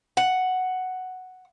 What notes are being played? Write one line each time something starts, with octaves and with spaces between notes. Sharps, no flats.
F#5